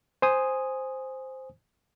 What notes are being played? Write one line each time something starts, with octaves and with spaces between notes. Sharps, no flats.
C5 G#5 D#6